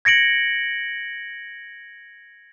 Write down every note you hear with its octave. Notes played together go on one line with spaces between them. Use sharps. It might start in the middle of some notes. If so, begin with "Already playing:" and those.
G#6 A#6 C#7 D7 F#7